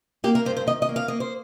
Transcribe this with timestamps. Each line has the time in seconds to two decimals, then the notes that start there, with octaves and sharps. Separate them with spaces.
0.24 A#3 G4
0.35 A#4
0.45 G2 C5
0.57 C5
0.67 D#3 D#5
0.82 D#5
0.89 A#3
0.96 F5
1.08 A#3 D#5
1.20 C5